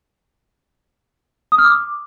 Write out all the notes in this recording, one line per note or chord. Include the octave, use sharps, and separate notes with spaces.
D#6
F6
D6